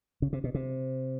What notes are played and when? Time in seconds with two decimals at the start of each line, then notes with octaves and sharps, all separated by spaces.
0.22 C#3
0.33 C3
0.44 B2
0.54 C3